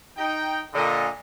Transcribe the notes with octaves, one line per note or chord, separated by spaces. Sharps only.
D#4 G5
A#2 D3 D#5